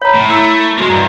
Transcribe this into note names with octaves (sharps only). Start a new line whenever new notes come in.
C#5 A#5 B5
A2
A3 E4 A#5 E6
G#3 A#3 F#4
E2 G2 A#5